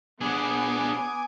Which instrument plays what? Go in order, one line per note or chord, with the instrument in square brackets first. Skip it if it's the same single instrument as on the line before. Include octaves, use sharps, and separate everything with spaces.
[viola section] B3 [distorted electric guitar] D4 G#4 [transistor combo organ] G#5 D6 D#6